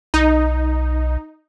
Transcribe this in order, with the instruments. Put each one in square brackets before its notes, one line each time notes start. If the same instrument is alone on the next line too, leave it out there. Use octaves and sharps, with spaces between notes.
[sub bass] B1 [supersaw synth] D#4